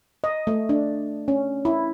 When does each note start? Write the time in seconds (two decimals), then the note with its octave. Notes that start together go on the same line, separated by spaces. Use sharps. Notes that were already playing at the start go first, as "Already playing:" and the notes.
0.24 D#5
0.47 A3
0.69 D4
1.28 C#4
1.65 E4